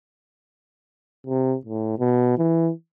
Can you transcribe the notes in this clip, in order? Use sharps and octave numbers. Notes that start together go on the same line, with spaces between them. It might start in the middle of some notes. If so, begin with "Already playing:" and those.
C3
A2
B2
E3